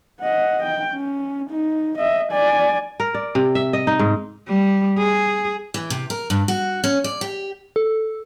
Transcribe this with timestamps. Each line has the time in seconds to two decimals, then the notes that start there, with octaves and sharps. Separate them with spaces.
0.21 D#5 F#5
0.63 G5
0.93 C#4
1.50 D#4
1.98 D#5 E5
2.32 D5 G#5
3.00 A#4
3.15 D5
3.35 C3
3.55 E5
3.73 D#5
3.87 D#4
3.99 G#2
4.48 G3
4.98 G#4
5.74 E3
5.90 C3
6.10 A#4
6.30 G2
6.48 F#4
6.84 C#4
7.04 D5
7.21 G4
7.76 A4